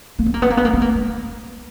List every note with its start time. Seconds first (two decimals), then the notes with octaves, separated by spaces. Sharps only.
0.19 A#3
0.26 B3
0.34 A#3
0.42 B3
0.50 A#3
0.57 B3
0.65 A#3
0.73 B3
0.82 A#3
0.95 G#3